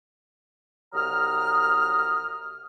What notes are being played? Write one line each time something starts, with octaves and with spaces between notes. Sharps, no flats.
C2 F#3 A#5 D#6 F6